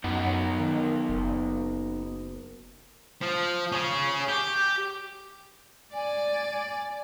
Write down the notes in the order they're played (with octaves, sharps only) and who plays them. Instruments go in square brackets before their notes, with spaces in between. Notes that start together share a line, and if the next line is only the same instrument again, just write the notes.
[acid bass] F#2 [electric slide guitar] B3 D#4 F#5
[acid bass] D#3
F#1
[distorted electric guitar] F3
C#4 G#4
G4
[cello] D5 [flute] G#5